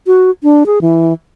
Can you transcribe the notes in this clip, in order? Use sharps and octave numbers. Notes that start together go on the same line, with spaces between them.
F#4
D4
G#4
E3